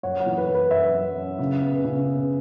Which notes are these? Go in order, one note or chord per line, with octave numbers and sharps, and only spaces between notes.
F#2 C#5 F#5
C#5 F#5
E3
B4
F#2
B4
F#2 B4 E5
F#2
C#4
C#3
B3
C#3
B3